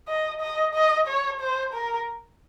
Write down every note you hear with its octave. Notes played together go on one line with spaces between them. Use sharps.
D#5
D#5
D#5
C#5
C5
A#4